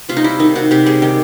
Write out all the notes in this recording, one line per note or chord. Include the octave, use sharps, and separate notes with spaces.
C3 F4
D#4
G3 E4
D#3 D#4
C3 F#4
C3 G4
G3 G#4
D#3 G4